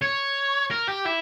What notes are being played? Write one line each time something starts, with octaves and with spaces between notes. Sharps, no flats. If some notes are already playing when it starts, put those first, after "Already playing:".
C#5
A#4
G4
E4